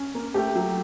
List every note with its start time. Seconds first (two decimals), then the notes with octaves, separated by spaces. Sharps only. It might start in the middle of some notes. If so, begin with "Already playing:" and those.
Already playing: C#4
0.15 A#3
0.34 A3 G4
0.55 F#3